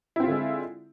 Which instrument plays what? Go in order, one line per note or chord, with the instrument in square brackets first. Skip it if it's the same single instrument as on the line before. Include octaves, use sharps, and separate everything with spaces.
[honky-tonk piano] E4
C4
F4
D3
G#3